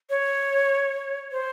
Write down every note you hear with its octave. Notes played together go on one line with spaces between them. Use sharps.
C#5
C5